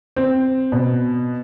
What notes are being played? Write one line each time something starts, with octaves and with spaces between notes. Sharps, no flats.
C4
B2